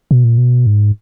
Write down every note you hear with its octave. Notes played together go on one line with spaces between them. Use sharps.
B2
A#2
B2
G#2